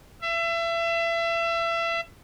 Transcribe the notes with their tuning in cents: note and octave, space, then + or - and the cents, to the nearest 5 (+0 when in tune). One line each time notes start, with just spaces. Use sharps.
E5 +30